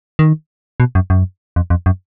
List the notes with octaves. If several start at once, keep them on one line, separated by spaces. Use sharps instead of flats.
D#3
B2
F#2
F#2
F2
F2
F#2